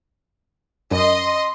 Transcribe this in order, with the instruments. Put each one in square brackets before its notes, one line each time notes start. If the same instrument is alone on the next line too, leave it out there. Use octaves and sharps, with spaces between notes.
[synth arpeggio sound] F#2 [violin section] D#5 C6